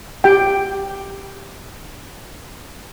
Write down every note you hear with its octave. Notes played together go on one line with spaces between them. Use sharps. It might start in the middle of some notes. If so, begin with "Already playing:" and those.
G4 G5